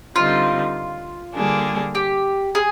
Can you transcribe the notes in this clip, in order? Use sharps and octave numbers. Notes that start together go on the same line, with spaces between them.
D3 G3 C4 D#4 F4
D3 G3 A#3 D4 G#4
G4
G#4